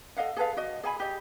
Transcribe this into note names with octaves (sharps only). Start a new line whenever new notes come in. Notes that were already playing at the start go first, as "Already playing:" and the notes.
A4 D#5 F5 F#5
G#4 A4 B4 F5
F#4 D#5
G#4 F5 G#5 B5
G4 G#4 D#5